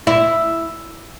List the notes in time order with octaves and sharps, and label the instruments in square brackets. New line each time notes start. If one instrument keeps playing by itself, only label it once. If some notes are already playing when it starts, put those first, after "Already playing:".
[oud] E4